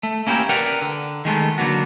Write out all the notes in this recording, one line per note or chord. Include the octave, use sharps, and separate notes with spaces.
A3
A#3 C#4 E4 F#4 G4 A#4
A#4 B4 D5 F#5 G5 A#5
D3
D#3 G#3 A3 B3
D3 F#3 A#3 B3 F#4